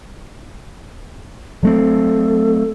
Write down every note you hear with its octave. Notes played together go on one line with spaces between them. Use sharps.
F#3 A3 C4 A4